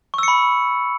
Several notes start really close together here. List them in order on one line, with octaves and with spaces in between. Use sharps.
C#6 E6 C#7 B5